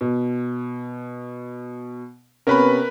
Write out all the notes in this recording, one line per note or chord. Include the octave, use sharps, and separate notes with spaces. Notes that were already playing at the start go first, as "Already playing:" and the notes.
B2
C3 B3 C#4 A#4 B4 B5